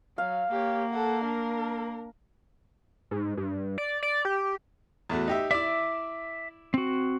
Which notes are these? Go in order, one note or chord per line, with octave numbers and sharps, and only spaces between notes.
F#3 F5
A#3 G4 C#5
A4 F#5
D4 A#4
G#2
G2
D5
D5
G4
E2 A3 F#4
D#4 G4 E5
E4 D5 E5 D6
C4 F#4